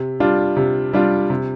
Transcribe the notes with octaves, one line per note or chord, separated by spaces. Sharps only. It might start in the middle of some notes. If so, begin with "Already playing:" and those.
Already playing: C3
G3 D4 F4
C3
G3 D4 F4
C3